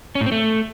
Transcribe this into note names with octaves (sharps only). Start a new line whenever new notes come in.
C#4
A2
C4
A3